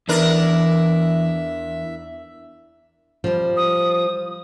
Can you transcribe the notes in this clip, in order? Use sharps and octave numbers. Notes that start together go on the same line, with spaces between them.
E2 E3 D4 A#4 E5
F3 G3
D#6